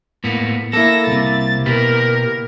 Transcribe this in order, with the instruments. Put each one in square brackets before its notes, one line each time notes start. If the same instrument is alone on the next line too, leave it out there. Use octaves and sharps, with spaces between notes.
[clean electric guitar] A2 A#3 B3
[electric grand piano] A#3 E4 [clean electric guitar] A4 [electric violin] A#6
[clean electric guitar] C2 C3 [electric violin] A6
[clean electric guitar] B2 G4 B4 [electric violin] A#4